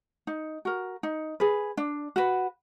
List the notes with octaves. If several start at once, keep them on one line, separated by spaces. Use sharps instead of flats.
D#4
F#4 A#4
D#4
G#4 B4
D4
F#4 B4